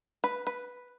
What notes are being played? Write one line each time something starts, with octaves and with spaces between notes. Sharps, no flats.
B4
B4